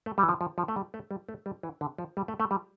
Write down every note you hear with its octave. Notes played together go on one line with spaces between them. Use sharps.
A3
G3
E3
F3
F3
F3
A3
G3
A3
G3
A3
G3
E3
D3
F3
G3
A3
A3
G3